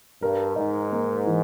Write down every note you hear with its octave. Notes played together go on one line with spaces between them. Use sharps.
G2 A#4
G#2 D#4
A#3
E3